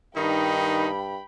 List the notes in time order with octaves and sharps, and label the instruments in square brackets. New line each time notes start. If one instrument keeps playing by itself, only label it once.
[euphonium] G2 [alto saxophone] D#3 [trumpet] D#4 [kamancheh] G5 B5